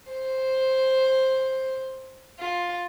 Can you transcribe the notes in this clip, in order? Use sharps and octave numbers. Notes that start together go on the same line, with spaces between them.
C5
F4